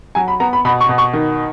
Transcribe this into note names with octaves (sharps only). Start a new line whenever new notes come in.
F#3 G#5
B5
B3 A#5
B5
B2 B5
C#6
B2
C#6
D#3